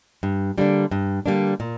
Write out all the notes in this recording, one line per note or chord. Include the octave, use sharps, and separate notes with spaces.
G2
D3 G3 A#3 D4
G2
D3 G3 A#3 D4
A#2